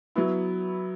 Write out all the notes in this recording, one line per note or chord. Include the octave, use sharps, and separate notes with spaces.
F#3 B3 E4